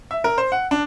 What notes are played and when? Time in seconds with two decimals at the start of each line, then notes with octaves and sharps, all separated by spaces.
0.11 E5
0.24 A#4
0.38 C5
0.52 F#5
0.71 D4